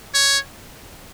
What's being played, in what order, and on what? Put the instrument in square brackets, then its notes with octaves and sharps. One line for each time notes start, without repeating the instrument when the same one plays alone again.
[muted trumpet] C#5